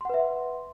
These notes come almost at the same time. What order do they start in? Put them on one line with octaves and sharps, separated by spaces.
C6 F#5 B4 E5